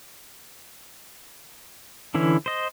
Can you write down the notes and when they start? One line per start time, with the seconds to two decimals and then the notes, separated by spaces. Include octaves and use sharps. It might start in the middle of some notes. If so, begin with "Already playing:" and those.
2.14 D3 E3 C#4 E4
2.46 C5 D#5